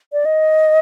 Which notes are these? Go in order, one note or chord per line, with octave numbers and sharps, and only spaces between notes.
D5
D#5